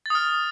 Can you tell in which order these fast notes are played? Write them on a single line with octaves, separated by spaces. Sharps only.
A6 D#6 F6